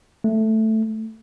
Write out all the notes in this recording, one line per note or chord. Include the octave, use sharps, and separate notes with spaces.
A3